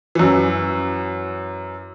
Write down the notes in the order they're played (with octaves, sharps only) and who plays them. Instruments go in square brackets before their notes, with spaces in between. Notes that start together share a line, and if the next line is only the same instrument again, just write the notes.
[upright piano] F#2 E3